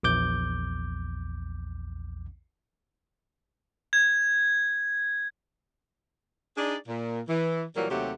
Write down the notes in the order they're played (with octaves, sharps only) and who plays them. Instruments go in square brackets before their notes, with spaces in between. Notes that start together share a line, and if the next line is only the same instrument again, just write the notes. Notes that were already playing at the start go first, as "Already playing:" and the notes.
[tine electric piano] A#1 E2 D6 G6
[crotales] G#6
[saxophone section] D4 D#4 G#4 D5
A#2
E3
A#2 E3 F#3 G3 A#3
D#2 C3 F#3 A3 G4 F#5